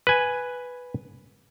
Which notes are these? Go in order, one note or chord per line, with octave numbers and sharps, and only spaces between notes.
B4 G#5